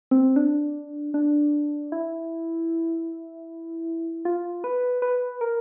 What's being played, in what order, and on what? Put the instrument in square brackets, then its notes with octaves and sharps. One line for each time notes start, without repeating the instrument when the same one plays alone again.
[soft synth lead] C4
D4
D4
E4
F4
B4
B4
A#4